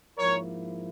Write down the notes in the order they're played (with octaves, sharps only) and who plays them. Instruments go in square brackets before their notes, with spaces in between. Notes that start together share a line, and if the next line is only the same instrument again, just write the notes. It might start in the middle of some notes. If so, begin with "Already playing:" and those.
[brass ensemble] G#2 F3 A#3 E4 A#4 C#5